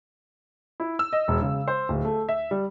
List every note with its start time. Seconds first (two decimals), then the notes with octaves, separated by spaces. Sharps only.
0.80 E4
0.99 E6
1.13 D#5
1.28 E1
1.41 C#3
1.68 C5
1.89 D1
2.05 A3
2.29 E5
2.51 G3